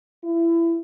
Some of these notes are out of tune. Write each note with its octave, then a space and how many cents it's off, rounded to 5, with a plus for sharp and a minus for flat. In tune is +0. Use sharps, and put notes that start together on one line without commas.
E4 +25